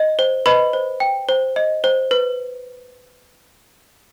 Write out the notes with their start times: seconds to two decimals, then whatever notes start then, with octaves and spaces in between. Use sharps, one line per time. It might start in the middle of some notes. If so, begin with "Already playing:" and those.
Already playing: D#5
0.19 C5
0.46 B4 D#5 B5
0.73 C5
1.00 G5
1.29 C5
1.56 D#5
1.84 C5
2.11 B4